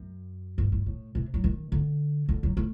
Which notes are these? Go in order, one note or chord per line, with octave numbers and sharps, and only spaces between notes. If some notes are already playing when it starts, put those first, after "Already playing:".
Already playing: F#2
G2
G2
A2
C3
F#3
D#3
D3
D3
F#3
A3